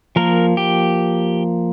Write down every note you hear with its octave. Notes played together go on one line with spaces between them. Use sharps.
F3 A#3 A#4
G4